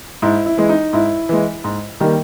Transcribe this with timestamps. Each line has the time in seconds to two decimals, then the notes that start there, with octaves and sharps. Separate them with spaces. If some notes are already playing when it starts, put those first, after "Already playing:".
0.22 G#2 E4
0.46 E4
0.57 E3 G#3
0.69 D#4
0.93 G#2 E4
1.29 E3 G#3
1.64 G#2
2.00 D#3 G3 A#3